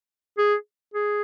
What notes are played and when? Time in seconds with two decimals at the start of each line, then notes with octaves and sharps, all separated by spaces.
0.38 G#4
0.94 G#4